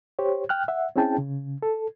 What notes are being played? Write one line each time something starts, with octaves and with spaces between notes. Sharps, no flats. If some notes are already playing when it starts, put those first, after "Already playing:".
G4 C5 C#5
G5 F6 F#6
E5 F#5
C4 C#4 E4 G#4 G5 A5
C#3
A4